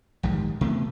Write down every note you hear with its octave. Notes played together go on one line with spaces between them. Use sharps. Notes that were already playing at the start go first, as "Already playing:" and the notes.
A#1 G#2 D#3 G3
C3 A3 B3